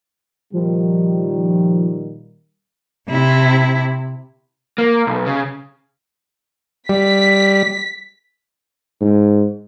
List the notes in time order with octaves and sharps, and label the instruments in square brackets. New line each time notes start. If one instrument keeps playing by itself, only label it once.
[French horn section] A#2 D#3 G3 [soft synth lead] F3
[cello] C3 E4
[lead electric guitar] A#3
B1
C#3
[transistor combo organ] G3 [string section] B6
[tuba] G#2